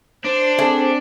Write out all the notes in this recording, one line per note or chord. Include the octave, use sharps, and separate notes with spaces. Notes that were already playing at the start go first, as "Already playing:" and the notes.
D4 C5
A3 C4 G#4 D5